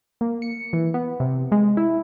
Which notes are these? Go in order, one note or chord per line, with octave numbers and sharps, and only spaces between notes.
A#3
C#7
E3
B3
C3
G#3
E4